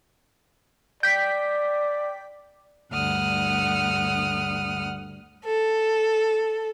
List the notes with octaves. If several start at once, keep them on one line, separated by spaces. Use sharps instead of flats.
D5 G5 B6
D2 G2 F#5 D#6 F6
A4